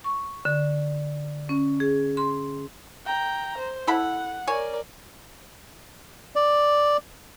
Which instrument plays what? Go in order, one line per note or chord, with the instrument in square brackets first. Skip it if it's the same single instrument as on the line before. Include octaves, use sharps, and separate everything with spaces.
[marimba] C#6
D3
C#4
G#4
C6
[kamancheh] G5 A#5
C5
[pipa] E4 A4 B5 [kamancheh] F#5
[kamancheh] A#4 D5 [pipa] C#5 G#5
[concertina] D5